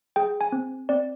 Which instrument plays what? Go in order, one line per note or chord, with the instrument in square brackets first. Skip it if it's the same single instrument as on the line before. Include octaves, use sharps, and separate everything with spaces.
[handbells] G#4 G5
G#5
C4
C4 D5